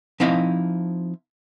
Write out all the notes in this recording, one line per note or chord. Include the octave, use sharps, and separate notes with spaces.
F3 C4 D#4 E4 E5 F5